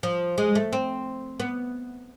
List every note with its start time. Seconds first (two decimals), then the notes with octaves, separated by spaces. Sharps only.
0.03 F3
0.38 G#3
0.55 A3
0.73 C4
1.40 B3